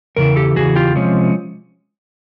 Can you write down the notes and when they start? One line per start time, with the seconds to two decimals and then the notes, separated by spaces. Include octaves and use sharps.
0.16 E2 C#3 E3 A#4
0.36 G4 A4
0.56 E2 C#3 E3 F#4 G#4
0.75 F4 G4
0.95 C3 F3 G#3 C#4